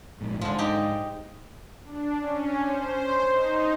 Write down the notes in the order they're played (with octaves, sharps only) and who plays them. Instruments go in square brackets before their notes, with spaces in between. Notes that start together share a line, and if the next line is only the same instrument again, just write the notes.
[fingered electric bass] A#1 G#2
[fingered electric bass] G#2 [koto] D3 F3
[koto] D#4 G4
[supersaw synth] D4
C#4
C5
D#4